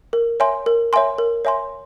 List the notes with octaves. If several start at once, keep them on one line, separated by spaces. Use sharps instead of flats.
A#4
C#5 E5 G#5 C6
A#4
C#5 E5 G#5 C6
A#4
C#5 E5 G#5 C6